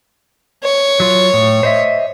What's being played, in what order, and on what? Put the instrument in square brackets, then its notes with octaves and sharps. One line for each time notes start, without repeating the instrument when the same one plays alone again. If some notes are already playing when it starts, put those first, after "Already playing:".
[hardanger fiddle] C#5
[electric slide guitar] F#3 F4
A2
C5 D#5 E5